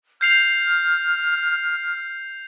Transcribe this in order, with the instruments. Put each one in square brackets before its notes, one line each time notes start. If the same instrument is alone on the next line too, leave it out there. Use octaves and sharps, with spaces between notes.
[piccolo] F6 [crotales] G6 C7 F7